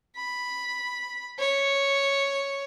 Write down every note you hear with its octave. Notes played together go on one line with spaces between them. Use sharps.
B5
C#5